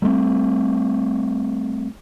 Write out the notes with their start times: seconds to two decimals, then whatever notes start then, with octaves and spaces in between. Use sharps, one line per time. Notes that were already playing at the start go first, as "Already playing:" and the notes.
0.02 G3 A3 B3 C4